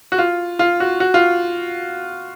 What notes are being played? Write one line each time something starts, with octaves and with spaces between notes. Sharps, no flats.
F#4
F4
F4
F#4
F#4
F4